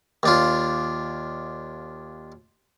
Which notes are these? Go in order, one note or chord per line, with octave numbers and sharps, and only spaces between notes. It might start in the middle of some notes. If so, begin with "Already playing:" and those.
D#2 D4 F4